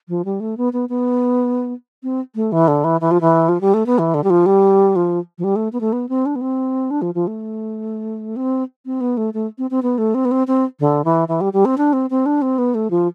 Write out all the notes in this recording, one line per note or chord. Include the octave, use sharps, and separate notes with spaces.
F3
G3
A3
B3
B3
B3
C4
A3
E3
D3
E3
E3
F3
E3
F3
G3
A3
B3
E3
D3
G3
F3
G3
F3
F3
G3
A3
B3
A3
B3
C4
D4
B3
C4
D4
F3
F3
A3
C4
C4
B3
A3
A3
C4
C4
B3
A3
C4
B3
C4
C4
D3
E3
E3
G3
G3
C4
D4
C4
C4
D4
C4
B3
A3
F3